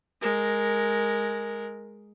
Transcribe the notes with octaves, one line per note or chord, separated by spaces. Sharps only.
G#3 A#4